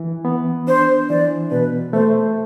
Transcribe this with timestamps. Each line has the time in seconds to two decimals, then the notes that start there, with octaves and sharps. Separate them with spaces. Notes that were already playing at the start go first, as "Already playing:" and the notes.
Already playing: E3
0.25 B3
0.67 D4 C5
1.09 E3 D5
1.51 B2 B4
1.93 A3 C5